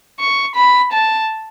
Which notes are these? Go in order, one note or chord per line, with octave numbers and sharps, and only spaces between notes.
C#6
B5
A5